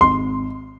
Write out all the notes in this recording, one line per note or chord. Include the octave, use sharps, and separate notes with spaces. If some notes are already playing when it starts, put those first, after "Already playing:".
G#1 C6